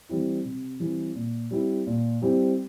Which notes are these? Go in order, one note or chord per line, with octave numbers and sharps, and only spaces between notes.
E3 G3 C4 E4
C3
E3 G3 C4 E4
A#2
G3 C4 E4 G4
A#2
G3 C4 E4 G4